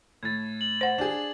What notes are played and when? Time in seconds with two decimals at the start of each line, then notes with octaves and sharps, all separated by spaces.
0.23 A2 G#6 A6
0.61 F#7
0.81 C5 F#5
0.98 D4 G#4